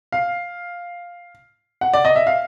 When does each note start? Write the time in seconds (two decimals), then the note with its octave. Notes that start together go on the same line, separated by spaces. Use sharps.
0.12 F5
1.81 F#5
1.93 D5
2.05 D#5
2.16 E5
2.27 F5